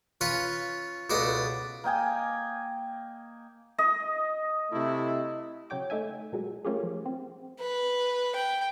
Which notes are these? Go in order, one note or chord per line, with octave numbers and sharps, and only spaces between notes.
C#4 F4 B4 C#5
C#2 B2 A4 D5 D#5 D#6
A#3 D#5 G5 G#5
D#5
C3 A3 E4
C#3 F#3 C#5 G5 D6
A3 D#4 E5 G#5
A#2 F#3 G#3
A3 A#3 C#4 F4 G4 G#4
F3
C4
B4
G5